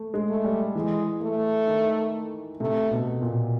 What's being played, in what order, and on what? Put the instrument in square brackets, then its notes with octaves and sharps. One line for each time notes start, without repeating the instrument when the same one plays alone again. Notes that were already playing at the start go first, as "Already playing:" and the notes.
Already playing: [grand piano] A3
G#3
[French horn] A3
[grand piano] G3
[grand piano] E3 [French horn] G#3
[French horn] A3
[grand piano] D#3
[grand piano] C3 [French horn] A3
[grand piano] B2
A#2